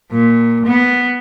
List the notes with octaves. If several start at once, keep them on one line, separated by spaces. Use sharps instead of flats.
A#2
B3